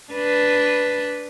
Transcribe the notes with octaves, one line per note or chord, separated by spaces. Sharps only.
D4 B4